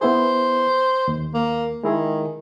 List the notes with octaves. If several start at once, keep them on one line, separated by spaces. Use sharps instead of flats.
B3 E4 G#4 C5
D#2
A#3
D#3 G#3 E4 G#4